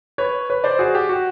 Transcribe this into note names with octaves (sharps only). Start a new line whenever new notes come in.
B4 C#5
B4 C#5
C5 D5
F#4 G#4
G4
F#4